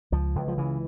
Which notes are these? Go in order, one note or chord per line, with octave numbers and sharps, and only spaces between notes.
C#2 F3
C#2
F3
C#3 E3